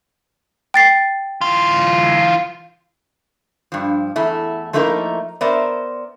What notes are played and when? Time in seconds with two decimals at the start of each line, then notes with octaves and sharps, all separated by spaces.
0.74 G5 A6 C7
1.41 E3 F4
3.72 G2 F3
4.16 E2 A3 E4
4.73 F3 A3 A#3 D#4 E4 A#4
5.41 B3 A#4 C5 D5 E5